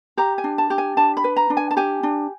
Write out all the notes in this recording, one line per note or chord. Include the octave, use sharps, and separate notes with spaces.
G4 A#5
G#5
D4
A5
G4
G#5
D4 A5
B5
B4
A#5
D4
G#5
A5
G4 G#5
D4